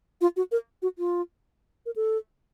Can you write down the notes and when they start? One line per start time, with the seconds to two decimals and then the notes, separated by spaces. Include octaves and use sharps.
0.21 F4
0.36 F#4
0.52 A#4
0.82 F#4
0.98 F4
1.86 A#4
1.96 A4